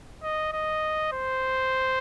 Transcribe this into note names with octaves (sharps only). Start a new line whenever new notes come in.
D#5
D#5
C5